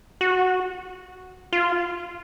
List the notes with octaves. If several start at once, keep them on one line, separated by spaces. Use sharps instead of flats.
F#4
F4